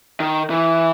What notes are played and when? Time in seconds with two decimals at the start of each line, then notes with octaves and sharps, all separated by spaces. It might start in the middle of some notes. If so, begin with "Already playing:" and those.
0.20 D#3
0.50 E3